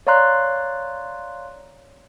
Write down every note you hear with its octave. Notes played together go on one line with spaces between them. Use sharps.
C#5 D5 F5 A#5 C6 F#6